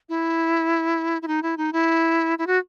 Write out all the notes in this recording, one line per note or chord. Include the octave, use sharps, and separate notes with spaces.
E4
E4
D#4
E4
D#4
E4
E4
F#4